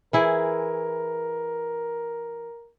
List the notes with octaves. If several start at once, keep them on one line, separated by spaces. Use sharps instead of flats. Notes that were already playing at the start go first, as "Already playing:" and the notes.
E3 E4 G#4 A#4